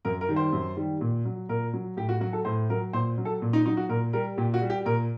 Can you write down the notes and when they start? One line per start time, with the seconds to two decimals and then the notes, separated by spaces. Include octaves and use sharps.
0.05 F#2 A#4
0.21 A#4
0.29 D#3 G3
0.36 C5
0.53 F#2
0.77 D#3 G3
1.01 A#2
1.25 F#3
1.49 A#2 A#4
1.74 F#3
1.97 A2 G4
2.09 F#4
2.21 F#3 F#4
2.33 A4
2.45 A2 C5
2.70 F#3 A#4
2.93 A#2 C5
3.18 F#3
3.25 A4
3.42 A#2
3.53 D#4
3.66 F#3 D#4
3.77 F#4
3.89 A#2 A#4
4.13 G3 A#4
4.38 A#2 G4
4.54 F#4
4.62 G3
4.70 G4
4.85 A#2 A#4